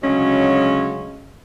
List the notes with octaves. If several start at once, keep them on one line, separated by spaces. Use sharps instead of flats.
D2 C#3 F#3 G#3 C#4